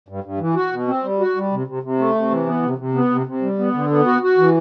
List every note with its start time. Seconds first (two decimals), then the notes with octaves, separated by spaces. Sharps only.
0.08 G2
0.24 G2
0.39 E3
0.55 F#4
0.72 B2
0.88 C4
1.04 G3
1.19 F#4
1.36 G3
1.52 C3
1.67 C3
1.83 C3
1.99 A3
2.15 C3
2.30 E3
2.47 B3
2.63 C3
2.78 C3
2.95 B3
3.11 C3
3.27 C3
3.42 G3
3.59 B3
3.74 D3
3.90 B3
4.06 F#4
4.22 F#4
4.38 E3